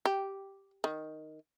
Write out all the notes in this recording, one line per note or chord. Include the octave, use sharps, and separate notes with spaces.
G4
D#3